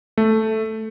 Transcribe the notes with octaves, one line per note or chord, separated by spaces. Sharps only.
A3